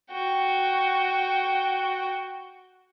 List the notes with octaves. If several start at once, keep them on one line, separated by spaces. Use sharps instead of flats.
F#4 G5